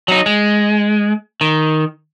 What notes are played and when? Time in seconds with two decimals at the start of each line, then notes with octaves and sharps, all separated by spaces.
0.08 F#3 D#4
0.26 G#3
1.41 D#3